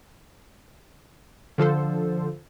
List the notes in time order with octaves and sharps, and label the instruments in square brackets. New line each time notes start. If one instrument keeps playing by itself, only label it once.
[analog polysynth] D3 F3 A4 C5